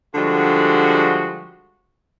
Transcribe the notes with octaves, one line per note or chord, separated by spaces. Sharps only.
D3 F3 G3 G#3 F#4